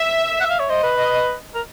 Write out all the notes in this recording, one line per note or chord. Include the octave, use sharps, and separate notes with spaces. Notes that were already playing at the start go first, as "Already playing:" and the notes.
Already playing: E5
F#5
E5
F5
C#5
C5 D#5
B4
D#5
A#4